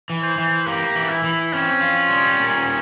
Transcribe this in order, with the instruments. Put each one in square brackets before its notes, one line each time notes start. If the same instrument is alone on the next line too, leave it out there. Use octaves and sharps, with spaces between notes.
[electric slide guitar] E3
[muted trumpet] C5
[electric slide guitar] E3
[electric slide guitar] A#3 [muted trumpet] G4
[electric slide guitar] E3
[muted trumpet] E4
[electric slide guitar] E3
[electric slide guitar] C4 [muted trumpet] C#4
[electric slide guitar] F4
G3
A#2